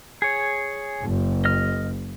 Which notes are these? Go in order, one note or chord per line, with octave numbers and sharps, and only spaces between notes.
G#4 C#5
F#1
D#5 F6